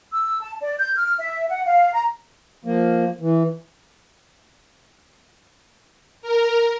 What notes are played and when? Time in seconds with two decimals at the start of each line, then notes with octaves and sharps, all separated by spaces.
0.12 E6
0.41 A5
0.61 D5
0.79 G6
0.95 F6
1.19 E5
1.50 F#5
1.66 F5
1.93 A#5
2.65 F3 A#3
3.21 E3
6.22 A#4